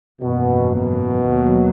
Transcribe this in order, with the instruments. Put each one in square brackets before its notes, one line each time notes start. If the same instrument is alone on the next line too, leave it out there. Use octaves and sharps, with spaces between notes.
[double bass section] G#1 F#2 E3 A#3 [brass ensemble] B2
[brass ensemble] B2
[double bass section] D#2 D#3 F#3 A#3